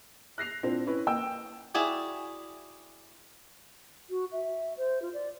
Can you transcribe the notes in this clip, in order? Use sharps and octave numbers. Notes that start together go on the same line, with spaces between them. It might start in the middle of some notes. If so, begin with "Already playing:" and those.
F#6 A#6 C7 F7
A#2 C4 D4 E4
C#4 E4 B4
A#3 G5 E6
E4 F#4 G#4 D5 G5
F#4
E5
C5
F4
D5